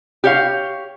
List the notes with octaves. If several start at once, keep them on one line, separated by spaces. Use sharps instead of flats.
G4 C#5 F5